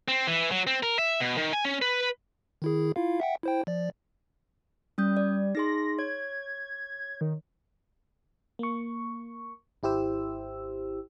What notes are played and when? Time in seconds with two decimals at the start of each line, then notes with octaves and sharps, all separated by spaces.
0.08 C4
0.27 E3
0.51 F#3
0.67 C4
0.83 A#4
0.99 E5
1.20 B2
1.38 D#3
1.53 G#5
1.65 C#4
1.82 B4
2.62 D#3 E4 G#4
2.96 E4 F4 F5
3.20 E5 F#5 G5
3.43 E4 C5 G5
3.67 F3 D5
4.98 G3 C#4 D#6 G6
5.17 D5
5.55 D#4 G#4 C6 A#6
5.99 C#5 G#6
7.21 D#3
8.59 A#3 C#6
9.83 G#1 E4 G4 C5 E6